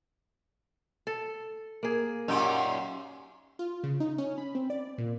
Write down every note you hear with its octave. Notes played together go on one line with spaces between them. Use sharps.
A4
A#3 G#4
F#2 A#2 C#4 D#4 G4
F4
C#3
D#4
C#4
B5
C4
D5
A#2